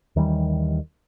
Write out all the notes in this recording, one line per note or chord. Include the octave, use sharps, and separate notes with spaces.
D#2 D#3 E3 G3